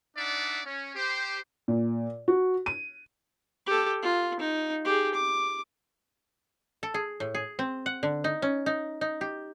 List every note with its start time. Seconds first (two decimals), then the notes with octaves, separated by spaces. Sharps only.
0.17 D4 D#4 D5 E5 F#5
0.65 C#4
0.95 G4 C5
1.68 A#2
2.28 F#4
2.66 D#7
3.67 G4 A4
4.02 F4
4.40 D#4
4.85 G4 G#4
5.14 D6
6.83 A4
6.94 G#4
7.20 A2
7.34 G#4
7.59 C4
7.86 F#5
8.03 D3
8.24 D#4
8.42 C#4
8.66 D#4
9.01 D#4
9.21 G4